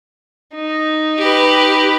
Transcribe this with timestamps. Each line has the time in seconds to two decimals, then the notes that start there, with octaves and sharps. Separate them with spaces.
0.55 D#4
1.19 G4 B4